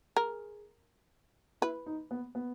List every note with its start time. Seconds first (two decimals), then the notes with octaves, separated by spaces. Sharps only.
0.16 G#4 A#4
1.62 E4 B4
1.86 D#4
2.11 B3
2.35 B3